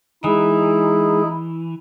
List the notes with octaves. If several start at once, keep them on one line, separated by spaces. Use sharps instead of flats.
E3 G#3 D#4 E4 G#4